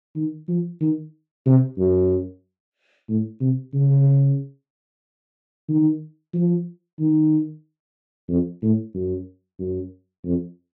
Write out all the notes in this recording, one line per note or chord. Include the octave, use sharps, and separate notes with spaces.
D#3
F3
D#3
C3
F#2
A2
C3
C#3
D#3
F3
D#3
F2
A2
F#2
F#2
F2